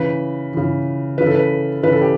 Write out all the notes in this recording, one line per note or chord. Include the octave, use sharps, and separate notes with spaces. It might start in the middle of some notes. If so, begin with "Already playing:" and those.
Already playing: C#3 E3 B4
C#3 E3
C#3 E3 B4
A4
B4
C#3 E3 B4
A4
G4